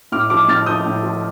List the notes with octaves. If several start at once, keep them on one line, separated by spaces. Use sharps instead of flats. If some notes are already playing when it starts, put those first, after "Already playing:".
A2 D6 F6
F3 D6 F6
A2 F6 A6
F3 D#6 G6
A2
F3